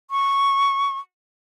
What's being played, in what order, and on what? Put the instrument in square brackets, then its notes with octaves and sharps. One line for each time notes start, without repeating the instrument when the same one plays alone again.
[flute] C#6